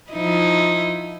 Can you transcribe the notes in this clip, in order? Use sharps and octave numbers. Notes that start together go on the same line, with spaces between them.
F3 D#4 E4